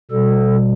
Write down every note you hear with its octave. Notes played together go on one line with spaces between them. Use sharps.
B2 G3 A4